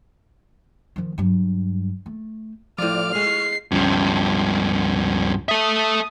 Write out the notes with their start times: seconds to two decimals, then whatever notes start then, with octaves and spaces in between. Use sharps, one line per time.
0.96 D#3 F3
1.18 G2 F#3
2.06 A3
2.78 A2 F3 F4 D5 D6 F6
3.15 G#3 C#6 C7
3.72 C#2 G2 F3
5.49 A4 E5 D#6